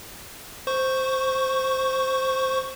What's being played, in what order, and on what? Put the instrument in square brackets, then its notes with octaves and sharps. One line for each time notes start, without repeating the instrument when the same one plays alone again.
[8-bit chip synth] C5 C#6